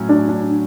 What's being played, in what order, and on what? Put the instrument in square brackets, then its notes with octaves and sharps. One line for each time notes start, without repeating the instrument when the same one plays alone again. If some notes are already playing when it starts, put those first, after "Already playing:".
Already playing: [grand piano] A2 F#3 C#4
[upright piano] D4
D4